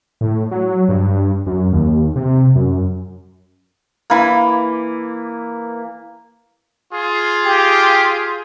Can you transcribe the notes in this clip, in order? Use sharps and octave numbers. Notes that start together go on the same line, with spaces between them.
A2
F#3
G2
F#2
D#2
C3
F#2
E3 A#3
F4 G#4
G4